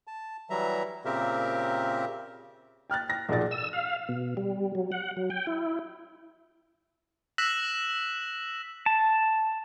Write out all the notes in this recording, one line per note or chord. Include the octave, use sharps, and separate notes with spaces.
A5
E3 F#3 G3 E5 A#5
A#2 C#3 C4 G4 A#4 E5
G5 F6 F#6 A6
A#6
B1 A#2 F3 G#4 D5 A6
E6
F5
B2
G3
F#3
F#5
F#3
G5
E4
E6 F#6 A#6 B6 E7 F#7
A5